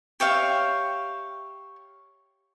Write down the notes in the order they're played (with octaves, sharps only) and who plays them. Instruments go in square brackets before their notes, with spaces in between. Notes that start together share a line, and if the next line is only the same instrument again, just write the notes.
[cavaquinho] G4 C#5 E5 F5